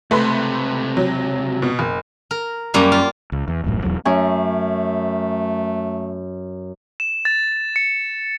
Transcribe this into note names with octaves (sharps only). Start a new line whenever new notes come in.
C#2 C3 A3 B4 C6
F#3
B2
F#1
A#4
F#2 G3 A#3
F4
C#2
E2
D#1 A1 F#2 A2
E1 A#1 E2 F#3
F#2 A3 C#4
E7
A6
C#7